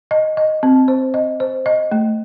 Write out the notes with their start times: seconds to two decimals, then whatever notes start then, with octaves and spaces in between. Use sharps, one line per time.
0.11 D#5
0.37 D#5
0.63 C4
0.88 C5
1.14 D#5
1.40 C5
1.66 D#5
1.92 A3